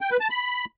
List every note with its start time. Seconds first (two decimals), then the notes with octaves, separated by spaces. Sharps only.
0.01 G5
0.11 B4
0.20 A5
0.30 B5